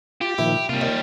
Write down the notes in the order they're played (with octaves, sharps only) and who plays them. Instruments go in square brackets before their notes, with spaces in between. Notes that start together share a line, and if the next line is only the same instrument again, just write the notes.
[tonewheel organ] F4 [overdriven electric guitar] G4
[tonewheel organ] A#2 D#3 F3 [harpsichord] E4
[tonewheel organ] C3 A#3 [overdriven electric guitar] G3 F4
[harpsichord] D#2